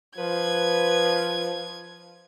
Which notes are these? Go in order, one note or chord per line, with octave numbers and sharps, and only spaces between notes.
F3 B4 G#6